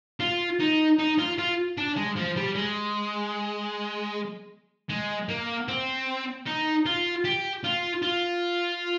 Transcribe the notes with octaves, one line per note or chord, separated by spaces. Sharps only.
F4
D#4
D#4
F4
F4
D4
G#3
F3
G3
G#3
G#3
A#3
C4
D#4
F4
G4
F4
F4